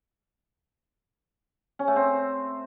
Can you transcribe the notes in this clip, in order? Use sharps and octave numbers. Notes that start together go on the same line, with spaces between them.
C#4
A3
C4